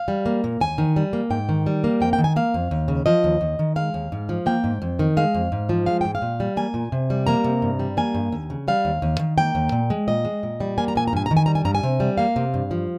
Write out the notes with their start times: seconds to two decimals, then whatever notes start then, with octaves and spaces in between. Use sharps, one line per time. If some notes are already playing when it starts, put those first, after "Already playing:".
Already playing: F5
0.08 G3
0.26 A#3
0.44 A#2
0.60 D#2 G#5
0.78 D#3
0.96 G3
1.13 A#3
1.30 G#2 G5
1.49 D#3
1.67 G3
1.84 A#3
2.00 F2 G5
2.13 G5
2.18 D#3
2.24 G#5
2.36 A#3 F5
2.54 F2
2.71 D#2
2.88 C#3
3.06 F3 D#5
3.24 D#2
3.41 D#2
3.59 D#3
3.76 G#3 F5
3.94 D#2
4.12 G#2
4.29 F3
4.46 A#3 G5
4.64 G#2
4.82 F2
4.99 D#3
5.17 G#3 F5
5.34 F2
5.52 G#2
5.69 F3
5.86 G#3 F5
6.01 G#2 G5
6.15 F5
6.22 A#2
6.40 G3
6.57 A#3 G#5
6.74 A#2
6.92 C3
7.10 G3
7.27 A#3 A#5
7.44 C3
7.62 G2
7.79 G3
7.97 A#3 G#5
8.14 G2
8.32 D#2
8.50 C#3
8.68 G3 F5
8.85 D#2
9.02 D#2
9.19 D#3
9.38 A#3 G5
9.55 D#2
9.72 A#2
9.90 G#3
10.08 A#2 D#5
10.25 G#3
10.43 A#2
10.60 G3
10.78 A#3 G#5
10.88 A#5
10.95 A#2 G#5
11.08 A#5
11.13 G2 G#5
11.26 A#5
11.31 D#3
11.37 G#5
11.46 G3 A#5
11.55 G#5
11.65 G2 A#5
11.75 G#5
11.83 C3
12.00 G3
12.18 A#3 F5
12.36 C3
12.54 G2
12.71 F3